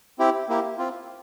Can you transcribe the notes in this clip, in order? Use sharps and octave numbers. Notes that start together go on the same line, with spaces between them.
C4 E4 G4
A#3 E4 G4
C4 F4